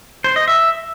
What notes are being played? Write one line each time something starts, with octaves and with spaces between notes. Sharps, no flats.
C5
D#5
E5